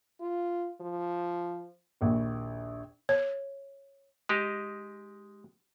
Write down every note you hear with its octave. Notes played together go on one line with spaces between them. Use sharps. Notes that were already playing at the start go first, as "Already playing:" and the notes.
F4
F3
A#1 D#2
C#5
G#3 D#4 G4